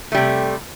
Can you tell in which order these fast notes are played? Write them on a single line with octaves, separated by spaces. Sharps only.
A3 G3 C3